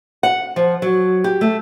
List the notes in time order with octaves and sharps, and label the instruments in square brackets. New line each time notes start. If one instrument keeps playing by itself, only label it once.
[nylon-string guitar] F#5
F3
F#3
G4
A3